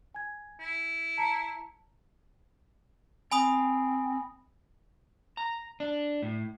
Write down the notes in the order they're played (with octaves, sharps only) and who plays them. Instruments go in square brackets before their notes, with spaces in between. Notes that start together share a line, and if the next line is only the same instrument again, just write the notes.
[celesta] G#5 G#6
[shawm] E4
[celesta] A5 A#5 C#7
[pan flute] C4 [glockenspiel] G#5 B5 D#6
[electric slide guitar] A#5
D4
A2